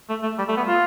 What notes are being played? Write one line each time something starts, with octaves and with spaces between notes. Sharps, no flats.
A3
A3
G3
A3
B3
F4